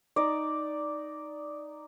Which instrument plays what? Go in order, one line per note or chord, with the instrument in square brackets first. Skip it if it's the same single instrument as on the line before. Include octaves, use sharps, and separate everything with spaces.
[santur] D#4 D5